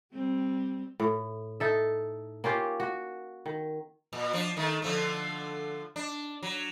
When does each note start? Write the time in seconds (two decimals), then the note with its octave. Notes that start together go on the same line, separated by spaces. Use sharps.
0.12 G3 C4
1.00 A2
1.60 D#4 A4 E5
2.44 A#3 C#4 F4 G4
2.80 F#4
3.46 D#3
4.13 A#2
4.33 F3 D4
4.57 D#3 A3
4.82 D3 F3 A3
5.96 D4
6.43 F#3